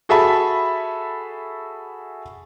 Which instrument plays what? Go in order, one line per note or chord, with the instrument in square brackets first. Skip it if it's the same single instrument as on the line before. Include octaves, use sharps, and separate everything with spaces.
[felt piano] F#4 G#4 A4 E5 A5 B5